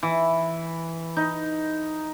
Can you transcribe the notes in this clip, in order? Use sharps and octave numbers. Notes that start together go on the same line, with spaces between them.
E3
D#4